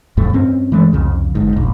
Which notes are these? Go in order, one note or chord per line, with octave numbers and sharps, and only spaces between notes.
F1 F2 A2 A3
G2 C4 C#4
E3 G#3 A3
C2 F2 C#3
G1 G#2
E1 A#1